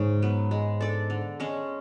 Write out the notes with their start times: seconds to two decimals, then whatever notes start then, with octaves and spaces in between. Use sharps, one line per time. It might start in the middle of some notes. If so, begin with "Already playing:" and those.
Already playing: G#2 C#3 G#3 C#4 G#4 C#5
0.22 F#3 B3
0.51 G#3
0.81 D4 A4 D5
1.10 D3
1.40 G#3 C#4